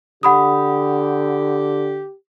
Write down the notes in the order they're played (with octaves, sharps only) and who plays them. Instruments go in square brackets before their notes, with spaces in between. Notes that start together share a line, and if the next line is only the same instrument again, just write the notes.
[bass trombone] D3 [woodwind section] G4 [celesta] F#5 B5 D#6